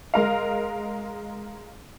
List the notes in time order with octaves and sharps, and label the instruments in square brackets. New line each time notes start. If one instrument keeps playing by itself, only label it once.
[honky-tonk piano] G#3 A#4 F5